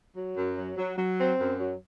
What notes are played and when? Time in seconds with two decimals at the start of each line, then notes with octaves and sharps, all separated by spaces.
0.16 F#3
0.36 F#2
0.57 F#3
0.77 F#3
0.98 F#3
1.19 C4
1.40 F#2
1.59 F#3